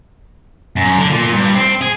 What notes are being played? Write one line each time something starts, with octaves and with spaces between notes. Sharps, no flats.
F#2
D3
A#2
G2
C4
G#4